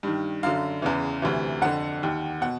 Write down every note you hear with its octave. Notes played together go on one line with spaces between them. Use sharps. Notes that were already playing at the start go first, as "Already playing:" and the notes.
G2 D#3
F#2 D3 F5
E2 C#3 E3
D2 C3 E3
F2 D3 F#5
D#2 D#3
B2 F#5